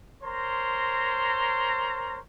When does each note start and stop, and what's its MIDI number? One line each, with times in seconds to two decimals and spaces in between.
0.23 2.18 70
0.23 2.18 72
0.23 2.18 73
0.23 2.18 82
0.23 2.18 84